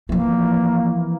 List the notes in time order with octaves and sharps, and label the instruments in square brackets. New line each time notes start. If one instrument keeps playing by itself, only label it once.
[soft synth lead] E3 [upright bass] F3 C4 [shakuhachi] A#3